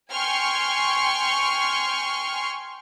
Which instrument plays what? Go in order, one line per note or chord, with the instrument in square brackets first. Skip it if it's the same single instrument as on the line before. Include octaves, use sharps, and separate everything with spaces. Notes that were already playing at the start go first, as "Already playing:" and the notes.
[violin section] G5 G#5 C6 C#6 F6